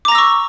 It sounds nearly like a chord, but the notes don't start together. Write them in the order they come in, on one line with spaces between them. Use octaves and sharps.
D6 A#5 A#6 E6 C#6